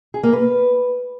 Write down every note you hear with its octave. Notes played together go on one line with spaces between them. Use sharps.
G#4
A#3
B4